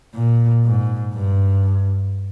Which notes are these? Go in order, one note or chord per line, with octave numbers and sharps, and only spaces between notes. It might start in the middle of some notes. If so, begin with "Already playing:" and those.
A#2
G#2
G2